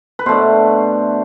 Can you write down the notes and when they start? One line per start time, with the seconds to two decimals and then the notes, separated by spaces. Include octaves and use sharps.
0.19 B4
0.26 B2 A3 D4 C5